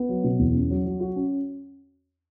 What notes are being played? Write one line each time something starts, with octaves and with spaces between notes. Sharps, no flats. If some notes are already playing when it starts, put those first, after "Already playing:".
Already playing: B3
F#3
B2
E2
C#4
F#3
F#3
F#4
C#4